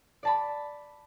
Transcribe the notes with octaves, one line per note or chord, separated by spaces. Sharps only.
D5 A5 B5